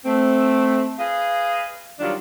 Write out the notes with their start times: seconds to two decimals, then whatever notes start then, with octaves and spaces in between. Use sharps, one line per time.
0.05 A3 C4
0.98 G#4 B4 D#5 F5
2.00 D#3 F#3 G3 D4 F4